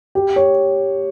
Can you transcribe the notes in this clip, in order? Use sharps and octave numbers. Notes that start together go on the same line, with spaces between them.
G4
C#5